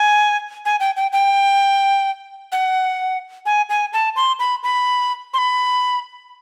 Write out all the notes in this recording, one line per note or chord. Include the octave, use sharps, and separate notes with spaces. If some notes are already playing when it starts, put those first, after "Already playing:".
Already playing: G#5
G#5
G5
G5
G5
F#5
G#5
G#5
A5
C6
B5
B5
C6
B5